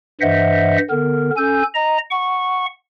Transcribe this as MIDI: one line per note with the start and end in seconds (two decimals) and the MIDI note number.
0.21 0.78 43
0.21 0.78 52
0.21 0.78 72
0.21 0.78 75
0.21 0.78 76
0.21 0.78 78
0.90 1.30 50
0.90 1.30 59
0.90 1.30 70
1.37 1.63 61
1.37 1.63 69
1.37 1.63 80
1.37 1.63 91
1.75 1.98 75
1.75 1.98 82
2.11 2.66 78
2.11 2.66 85